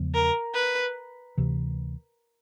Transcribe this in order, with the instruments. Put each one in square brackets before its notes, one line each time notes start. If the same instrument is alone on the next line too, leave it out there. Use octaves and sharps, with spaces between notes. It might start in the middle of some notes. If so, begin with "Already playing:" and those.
Already playing: [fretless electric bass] E2 C#3 F3 G#3
[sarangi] A#4
B4
[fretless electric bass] D2 C3 E3